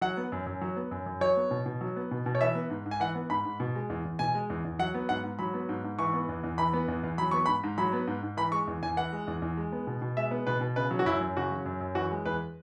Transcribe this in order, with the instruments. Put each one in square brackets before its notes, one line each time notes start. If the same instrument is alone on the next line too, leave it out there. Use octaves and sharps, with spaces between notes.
[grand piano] F#3 F#5
B3
F#2
F#2
F#3
B3
F#2
F#2
F#3 C#5
B3
B2
B2
F#3
B3
B2
B2
C#5
E3 E5
B3
G#2
G#2
G#5
E3 F#5
B3
G#2 B5
G#2
B2
G#3
E2
E2
B2 G#5
G#3
E2
E2
F#3 F#5
B3
G#2 F#5
G#2
F#3 B5
B3
G#2
G#2
E3 C#6
B3
E2
E2
E3 B5
B3
E2
E2
F#3 B5
B3 C#6
G#2 B5
G#2
F#3 B5
B3
G#2
G#2
E3 B5
G#3 C#6
E2
E2 G#5
E3 F#5
G#3
E2
E2
G#3
B3
B2
B2
G#3 E5
B3
B2 B4
B2
C#3 B4
F#3
F#4
F#2 E4
F#2
C#3 F#4
F#3
F#2
F#2
E3 F#4
G#3
E2 B4